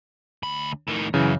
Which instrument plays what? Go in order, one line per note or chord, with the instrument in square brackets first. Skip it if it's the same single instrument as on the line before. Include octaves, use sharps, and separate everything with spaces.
[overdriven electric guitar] D2 B5
A2 D#3
[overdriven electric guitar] F#2 [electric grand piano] C#3 E3